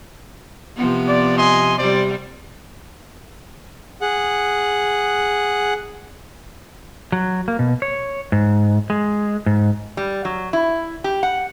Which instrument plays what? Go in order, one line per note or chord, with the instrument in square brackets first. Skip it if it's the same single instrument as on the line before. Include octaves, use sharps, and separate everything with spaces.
[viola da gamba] C3 F3 B3
[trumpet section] D5
D#5 G#5 C6
[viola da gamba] C3 G3 [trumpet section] C5 D5
[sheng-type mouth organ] G#4 F#5
[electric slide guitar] F#3
A#3
B2
C#5
G#2
G#3
G#2
[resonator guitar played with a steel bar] G3
F#3
E4
G4
F#5